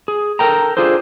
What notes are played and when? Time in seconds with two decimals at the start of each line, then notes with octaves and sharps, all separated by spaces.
0.08 G#4
0.39 A4 A#4 G5 A#5
0.77 D4 F4 G#4 A4 C5